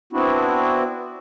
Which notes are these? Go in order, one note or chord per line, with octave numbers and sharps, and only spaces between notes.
B3 C4 D4 E4 F#4